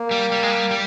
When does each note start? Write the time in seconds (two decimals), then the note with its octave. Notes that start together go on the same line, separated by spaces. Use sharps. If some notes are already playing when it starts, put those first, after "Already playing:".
Already playing: A#3
0.11 G3
0.32 G3
0.43 G#3
0.51 G3
0.71 G3